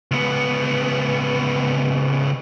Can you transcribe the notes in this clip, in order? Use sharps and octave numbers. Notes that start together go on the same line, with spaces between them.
C#2 B3